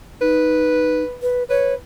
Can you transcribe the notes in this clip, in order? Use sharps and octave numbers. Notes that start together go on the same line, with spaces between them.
D#4 B4
B4
B4 C#5